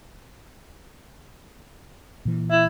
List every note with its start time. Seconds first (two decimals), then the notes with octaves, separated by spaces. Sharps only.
2.25 A#2 E3
2.51 E4